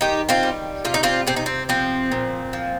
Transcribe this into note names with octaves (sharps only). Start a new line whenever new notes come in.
D#3 D#4 G4
C4 F4
G3
C3 F4
D#4
C4 F4
C3 C4
D#4
C4
F3 C4
A#2
F3